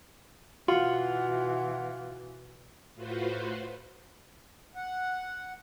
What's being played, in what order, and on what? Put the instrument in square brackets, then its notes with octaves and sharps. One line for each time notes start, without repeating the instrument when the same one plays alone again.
[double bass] B2 E3 [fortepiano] F4 [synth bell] F#4 [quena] F#5
[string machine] A2 F4 F#4 B4 C5
[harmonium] F#5